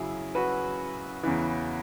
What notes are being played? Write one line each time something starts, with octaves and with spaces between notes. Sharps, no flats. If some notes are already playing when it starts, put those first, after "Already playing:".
Already playing: F#2 C#3 F#3 E4 G#4
F#4 B4
E2 C#3 E3